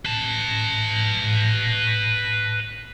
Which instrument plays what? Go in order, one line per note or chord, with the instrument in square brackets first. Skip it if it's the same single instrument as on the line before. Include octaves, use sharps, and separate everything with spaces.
[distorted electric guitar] B4 A5